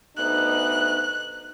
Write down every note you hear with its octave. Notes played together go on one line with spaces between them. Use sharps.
D2 B3 D#4 F#6